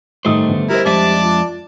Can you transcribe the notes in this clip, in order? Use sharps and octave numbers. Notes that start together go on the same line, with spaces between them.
A2 D#3 G3 A3 C5 D#6
D3 B3
G3 E4 A#4 C5
F2 G#3 D5 E5 A5
F4